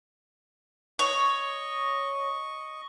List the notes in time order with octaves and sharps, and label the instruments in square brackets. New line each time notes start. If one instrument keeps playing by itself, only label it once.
[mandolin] C#5 [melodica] D#5 C#6